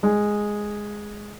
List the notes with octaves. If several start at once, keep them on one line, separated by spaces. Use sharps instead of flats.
G#3